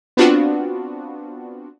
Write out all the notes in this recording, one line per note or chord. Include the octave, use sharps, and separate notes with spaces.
B3 C4 D4 F4 F#4